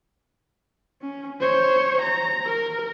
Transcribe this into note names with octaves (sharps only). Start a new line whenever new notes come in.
C#4
C5 C#5
A#5
A#4